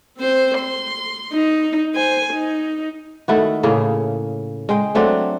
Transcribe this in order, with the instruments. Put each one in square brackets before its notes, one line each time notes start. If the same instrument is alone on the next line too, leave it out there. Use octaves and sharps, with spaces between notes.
[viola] C4 C5
C6
D#4
C5 G#5
D#4
[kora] D#3 A3 E4 F#4
A2 C#3 A#3 G#4
G#3 G5
F#3 A3 C4 D4